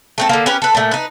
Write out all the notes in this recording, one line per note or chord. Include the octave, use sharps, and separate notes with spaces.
A3 C4 A4
D3 A#3
C#4 G4 A#4 B4
A4 B4
A#2 A3
D#4 B4